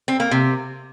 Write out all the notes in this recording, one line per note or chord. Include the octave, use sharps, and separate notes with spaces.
C4
A#3
C3